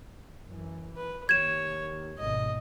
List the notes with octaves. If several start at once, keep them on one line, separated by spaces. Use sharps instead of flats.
F#2 E3
B4
D#2 C#5 G#6 E7
G#1 B2 D#5